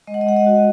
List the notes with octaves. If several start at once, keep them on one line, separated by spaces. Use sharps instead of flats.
G#3 D#5
F#5
D#5
G#3 F#5
D#5
F#4